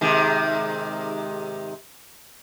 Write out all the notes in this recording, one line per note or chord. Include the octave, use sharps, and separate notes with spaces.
G#2 C3 D#3